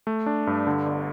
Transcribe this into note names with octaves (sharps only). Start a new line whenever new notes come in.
A3
D4
G2
D3
G1